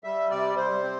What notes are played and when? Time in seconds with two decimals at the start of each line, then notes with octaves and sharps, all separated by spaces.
0.04 G3 E5
0.31 C3 D5
0.56 C3 C5
0.83 C4